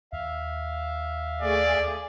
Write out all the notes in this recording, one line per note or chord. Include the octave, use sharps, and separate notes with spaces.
D#2 E5 F5
A3 G#4 D5